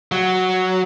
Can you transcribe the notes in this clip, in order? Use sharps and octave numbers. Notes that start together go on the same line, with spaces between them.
F#3